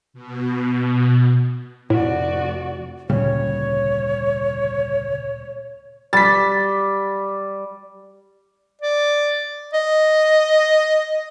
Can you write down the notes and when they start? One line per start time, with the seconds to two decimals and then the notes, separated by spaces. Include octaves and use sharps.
0.13 B2
1.90 F1 A2 F#4 D5
3.10 F1 D2 A#2 C#3 G3 C#5
6.13 G3 A6 B6
8.82 D5
9.74 D#5